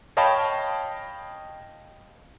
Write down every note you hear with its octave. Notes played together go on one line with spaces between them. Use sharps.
C#5 D#5 F5 G5 A5 B5